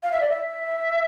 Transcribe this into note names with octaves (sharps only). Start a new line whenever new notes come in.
F5
E5
D5
E5